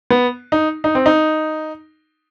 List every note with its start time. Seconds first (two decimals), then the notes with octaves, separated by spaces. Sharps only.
0.10 B3
0.52 D#4
0.84 D#4
0.95 C4
1.06 D#4